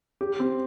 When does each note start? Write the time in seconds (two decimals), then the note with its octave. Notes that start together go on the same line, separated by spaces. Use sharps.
0.21 G4
0.39 C4